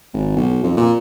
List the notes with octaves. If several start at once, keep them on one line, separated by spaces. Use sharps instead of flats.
G#1
B1
F2
A#2